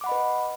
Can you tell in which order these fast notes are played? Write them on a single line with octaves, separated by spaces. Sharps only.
D6 F#5 B5 D#5 B4